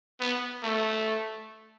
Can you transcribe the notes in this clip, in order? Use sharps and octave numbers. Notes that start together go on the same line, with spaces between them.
B3
A3